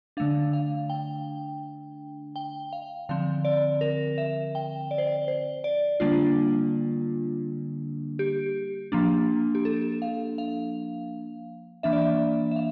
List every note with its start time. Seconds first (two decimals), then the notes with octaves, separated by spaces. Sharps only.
0.17 D3 A3 D4 F5
0.53 F5
0.90 G5
2.36 G5
2.73 F5
3.09 D3 F3 C4 F5
3.45 D5
3.81 A#4
4.18 E5
4.55 G5
4.91 D5
4.98 C5
5.07 D5
5.28 C5
5.64 D5
6.00 D3 G3 A#3 D4 F4
8.19 G4
8.92 F3 A#3 D4
9.55 G4
9.65 A4
10.02 F5
10.38 F5
11.83 E3 A#3 D4 E5
11.93 D5
12.02 E5
12.51 E5
12.56 F5